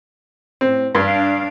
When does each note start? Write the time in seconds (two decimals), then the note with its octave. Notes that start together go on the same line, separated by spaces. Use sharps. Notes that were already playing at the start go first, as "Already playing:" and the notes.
0.61 A2 C4
0.95 G2 D4 D5 F5